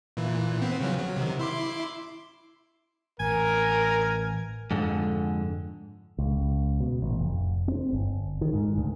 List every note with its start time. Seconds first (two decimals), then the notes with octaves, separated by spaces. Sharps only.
0.17 A#2 E3
0.61 B3 C4
0.80 C#3 F3 F#3
0.99 F#3
1.17 C3 D#3
1.39 E4 C6 D6
3.20 A1 A#4 G#5
4.71 F2 G#2 D3
6.18 C#2
6.80 B2
7.02 A1
7.19 F1
7.68 C4
7.93 G1
8.41 D#3
8.53 G#2
8.78 D2